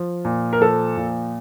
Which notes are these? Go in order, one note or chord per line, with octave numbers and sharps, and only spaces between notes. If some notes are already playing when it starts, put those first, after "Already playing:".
Already playing: F3
A#2
A#4
F3 A4
A#2